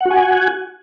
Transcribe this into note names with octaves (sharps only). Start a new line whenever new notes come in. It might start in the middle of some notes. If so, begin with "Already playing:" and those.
F#4 F#5 G#5